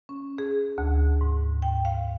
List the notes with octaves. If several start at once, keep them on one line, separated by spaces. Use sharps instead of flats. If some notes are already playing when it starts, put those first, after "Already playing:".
C#4
G#4
D2
G#2
G5
F5